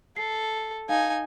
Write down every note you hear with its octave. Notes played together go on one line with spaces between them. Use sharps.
A4 C7
D#4 F5 G#5